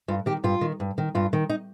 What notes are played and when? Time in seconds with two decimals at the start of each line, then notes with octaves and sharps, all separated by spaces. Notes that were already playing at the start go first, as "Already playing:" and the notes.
0.08 G2 F4
0.26 D#3 G4
0.44 G2 F4
0.61 D#3
0.80 G2
0.98 D#3
1.15 G2 F4
1.33 D#3
1.49 D#4